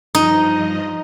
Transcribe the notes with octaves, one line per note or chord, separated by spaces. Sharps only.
G2 F3 D#4 D#5